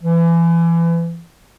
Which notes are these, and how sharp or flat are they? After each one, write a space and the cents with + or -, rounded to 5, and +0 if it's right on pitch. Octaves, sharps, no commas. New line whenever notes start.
E3 +30